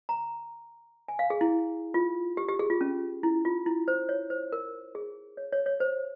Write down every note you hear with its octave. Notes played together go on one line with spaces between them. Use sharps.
A#5
G#5
F5
G#4
E4
F4
G4
G4
G#4
F4
C#4
E4
F4
E4
C5
C#5
C5
A#4
G#4
C#5
C#5
C#5
C5